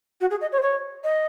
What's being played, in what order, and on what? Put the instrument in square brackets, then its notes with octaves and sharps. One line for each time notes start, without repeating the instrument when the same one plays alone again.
[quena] F#4
G#4
D#5
C#5
C5
C#5
D#5